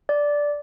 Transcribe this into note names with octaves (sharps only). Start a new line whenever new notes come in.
D5